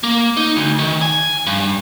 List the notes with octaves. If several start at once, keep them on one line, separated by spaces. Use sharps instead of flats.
A#3
D#4
D2
D#3
G#5
G2